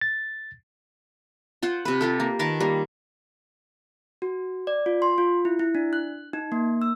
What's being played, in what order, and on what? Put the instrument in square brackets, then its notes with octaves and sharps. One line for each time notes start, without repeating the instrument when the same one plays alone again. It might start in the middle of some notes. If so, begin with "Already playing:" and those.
[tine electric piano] A6
[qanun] F4 C5 F#5
C3 B4
F4 G4 A4
A#3
D#3 A#4 B4 A5
G3 A#3
[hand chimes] F#4
D5
F4
C6
F4
E4
E4
D4
F#6
D#4
A#3
E6